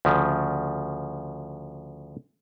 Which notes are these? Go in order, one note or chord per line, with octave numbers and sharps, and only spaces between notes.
D2 C#3 F3